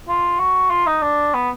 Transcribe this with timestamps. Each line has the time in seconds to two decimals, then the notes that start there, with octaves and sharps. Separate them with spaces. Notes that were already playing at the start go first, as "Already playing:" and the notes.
0.08 F4
0.39 F#4
0.70 F4
0.86 D#4
1.02 D4
1.34 B3